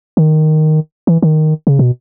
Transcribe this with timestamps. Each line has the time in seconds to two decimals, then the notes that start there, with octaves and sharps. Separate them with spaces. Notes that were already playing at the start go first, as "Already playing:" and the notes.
0.17 D#3
1.07 E3
1.22 D#3
1.67 C#3
1.79 B2